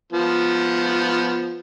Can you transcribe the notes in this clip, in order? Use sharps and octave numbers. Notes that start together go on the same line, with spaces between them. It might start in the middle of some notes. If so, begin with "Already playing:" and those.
F3 B3